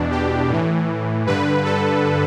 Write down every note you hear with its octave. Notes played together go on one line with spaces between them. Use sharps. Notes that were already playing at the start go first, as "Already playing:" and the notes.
Already playing: E2 B2 D4
G4
A2 E3
G2 D3 B4
A4